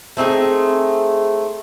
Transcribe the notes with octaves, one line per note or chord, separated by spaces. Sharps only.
A3 C4 D#4 G#4